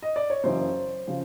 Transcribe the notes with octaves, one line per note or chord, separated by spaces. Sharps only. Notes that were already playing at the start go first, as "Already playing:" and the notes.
D#5
D5
C#5
F#1 F#2 C#3 E3 C5
C#3 F3